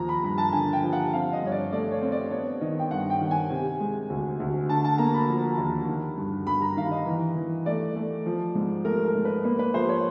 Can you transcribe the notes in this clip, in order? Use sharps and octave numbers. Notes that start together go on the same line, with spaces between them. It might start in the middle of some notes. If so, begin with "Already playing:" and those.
Already playing: D#2 F3 A#5
B5
G2 B5
A5
D3 G#5
G5
F3
F#5
C4 F5
D#5
G2 C#5
D5
A3 D5
C#5
C4
D5
B3 C#5
D#3 D#5
G5
G2 F#5
G5
D#3
G#5
C3
G#3
D2
D2
D3 A5
A5
A#3 A#5
B5
F3
D#2
D#3
G2
G2 B5
A#5
D#3 F5
D#5
E3
E3
A3 D5
A3
F3
G#2
A3 A#4
A#4
G#2
B4
A#3 B4
B4
F3 C5
C#5